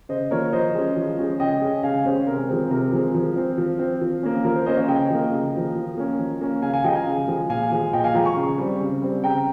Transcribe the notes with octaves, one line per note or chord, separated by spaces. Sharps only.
C#3 C5 D#5
F3 A#3 A#4 C#5
F3 C5 D#5
G#3 C#4
F3
G#3 C#4
C#3 D#5 G5
G#3 C#4
C#3 F5 G#5
G#3 C#4 C5
C3 A#4
F3 G#3 C4
C3 A#4
F3 G#3 C4
F3
C4
F3
C4
F3
A#3 C#4
F3 A#4
C5
A#3 C#4 C5 D#5
C#5 F5
C#3 D#5 G5
F3 A#3
C#3
F3 A#3
F3
A#3 C#4
F3
A#3 C#4
C#3 F5 G#5
F5 G#5
F3 G#3 D#5 G5
A#5
F5 G#5
C#3
F3 G#3
A#2 F5 G#5
F3 G#3
A#2 D#5 G5
F5 G#5
F3 G#3 G5 A#5
A#5 C#6
C#3
G3 C4
C#3
G3 C4
C#3 G5 A#5